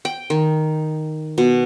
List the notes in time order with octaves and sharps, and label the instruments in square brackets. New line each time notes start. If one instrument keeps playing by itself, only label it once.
[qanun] G5
D#3
B2